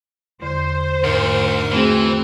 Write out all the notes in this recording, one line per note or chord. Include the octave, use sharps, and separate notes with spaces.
E2 D3 C5
D2 G#2 A#4
E3 A3 C4 F#4 G#4